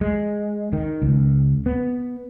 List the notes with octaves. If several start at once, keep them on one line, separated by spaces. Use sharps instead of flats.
G#3
D#3
C#2
B3